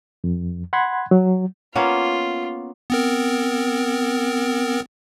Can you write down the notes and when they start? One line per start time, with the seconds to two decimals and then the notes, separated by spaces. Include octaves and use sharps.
0.24 F2
0.73 F#5 B5 C6 F#6 G#6
1.11 F#3
1.75 A#3 B3 C#4 F4
2.90 B3 C4 A#4